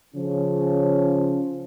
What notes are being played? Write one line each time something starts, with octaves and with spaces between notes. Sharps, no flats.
C#3 F3 C#4